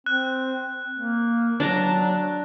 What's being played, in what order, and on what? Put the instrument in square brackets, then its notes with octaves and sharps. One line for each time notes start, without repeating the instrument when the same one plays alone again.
[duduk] C4 [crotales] F#6
[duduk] A#3
[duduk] F#3 [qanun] D4 A5 A#5